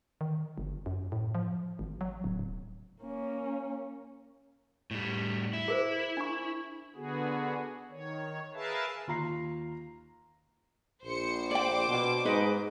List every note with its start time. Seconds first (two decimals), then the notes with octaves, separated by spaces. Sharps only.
0.21 D#3
0.58 G1
0.86 F#2
1.12 A2
1.35 F3
1.79 G#1
2.01 F#3
2.24 D1
2.39 D1
3.02 A#3 C#4
4.91 A2 G3
5.53 E4
5.68 G#4 A#4 C5
6.17 D4 C#6
6.95 D3 B3 F#4 G#4
7.91 D#3 C#5
8.54 G#4 A#4 B4 E5 F5 A5
9.07 D#2 F4 A#5 C7
11.04 A#1 C5 C#7
11.51 C5 D5 G5 D6
11.88 B2
12.25 G#2 G#3 D#4 B4 D#5